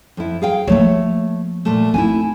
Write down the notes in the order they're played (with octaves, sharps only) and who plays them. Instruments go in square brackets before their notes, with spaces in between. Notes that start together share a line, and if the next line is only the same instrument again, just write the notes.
[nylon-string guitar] F2 E4
G#4 F5 G5
[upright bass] F3 A#3 [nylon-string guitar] A3 C#5
[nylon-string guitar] A#2 A3
[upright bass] C4 D#4 [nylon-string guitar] E4 G#5